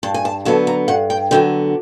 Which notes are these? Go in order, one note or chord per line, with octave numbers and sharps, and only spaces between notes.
G2 A5
G#5
A5
D3 F#3 B3 A5
A#5
G2 F#5
G5
D3 F#3 B3 G5